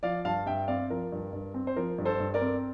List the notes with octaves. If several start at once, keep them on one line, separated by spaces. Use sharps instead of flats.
F3 D5 F5
G2 F5 A5
G2 E5 G5
C4 D5 F5
F3 A#4
G2
G2
C4
C5
F3 A#4
G2
A4 C5
G2
A#4 D5
C4